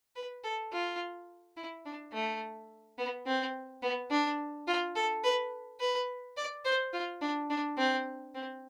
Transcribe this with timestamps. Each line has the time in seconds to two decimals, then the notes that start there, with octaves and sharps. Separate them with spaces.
0.16 B4
0.44 A4
0.72 F4
1.57 E4
1.85 D4
2.13 A3
2.98 B3
3.26 C4
3.82 B3
4.11 D4
4.67 F4
4.96 A4
5.24 B4
5.80 B4
6.37 D5
6.65 C5
6.93 F4
7.21 D4
7.50 D4
7.78 C4
8.34 C4